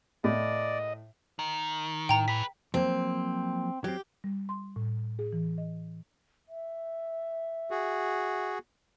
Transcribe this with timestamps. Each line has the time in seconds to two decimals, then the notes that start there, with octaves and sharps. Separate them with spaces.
0.24 A2 D5 D#5
1.39 D#3
2.09 A2 G5 A#5 F7
2.28 G#4 B4 B6
2.74 F3 F#3 A#3 C4
3.84 F#3 C4 G4
4.24 G3
4.49 C6
4.76 A2
5.19 G#4
5.33 E3
5.58 D#5
6.49 E5
7.71 F#4 G#4